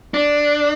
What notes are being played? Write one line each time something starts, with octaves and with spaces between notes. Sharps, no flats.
D4